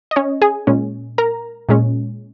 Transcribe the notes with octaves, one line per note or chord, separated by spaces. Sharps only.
D#5
C#4 C#5
G#4 G#5
A#2 G#3 C#4
A#4 A#5
A#2 G#3 C#4